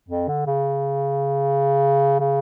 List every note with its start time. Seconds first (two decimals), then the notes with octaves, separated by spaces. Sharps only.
0.09 F2
0.28 D3
0.47 C#3
2.20 C#3